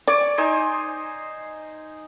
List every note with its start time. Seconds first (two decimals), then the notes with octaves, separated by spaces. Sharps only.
0.08 C#5 D5 D6
0.38 D#4 C5 G#5